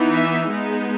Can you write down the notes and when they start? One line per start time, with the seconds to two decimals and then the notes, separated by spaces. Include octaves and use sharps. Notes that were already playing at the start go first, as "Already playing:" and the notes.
Already playing: E3 B3 D#4
0.14 E5
0.49 G#3 B3 D#4